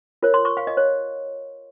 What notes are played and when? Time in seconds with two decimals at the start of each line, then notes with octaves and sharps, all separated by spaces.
0.23 F4 A#4 C#5
0.34 C6
0.45 C#6
0.57 F5
0.67 D#5
0.77 C#5